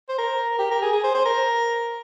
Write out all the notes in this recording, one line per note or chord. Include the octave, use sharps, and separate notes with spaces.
C5
A#4
G4
A#4
G#4
G#4
C5
C5
A#4